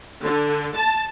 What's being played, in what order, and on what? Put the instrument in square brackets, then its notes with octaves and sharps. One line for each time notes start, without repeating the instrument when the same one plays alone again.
[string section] D3
A5